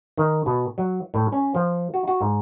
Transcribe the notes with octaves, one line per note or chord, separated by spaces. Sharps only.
D#3
B2
F#3
A2
C#4
F3
F#4
F#4
G#2